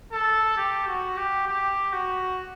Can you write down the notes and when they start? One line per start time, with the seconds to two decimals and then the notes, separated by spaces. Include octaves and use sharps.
0.12 A4
0.57 G4
0.88 F#4
1.17 G4
1.47 G4
1.93 F#4